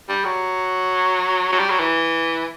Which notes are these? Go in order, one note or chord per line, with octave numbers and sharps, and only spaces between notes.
G3
F#3
F#3
G3
F#3
E3